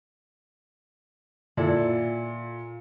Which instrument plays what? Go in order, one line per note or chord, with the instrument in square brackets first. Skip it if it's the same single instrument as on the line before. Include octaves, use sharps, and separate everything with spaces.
[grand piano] A#2 [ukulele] E4 A4 D5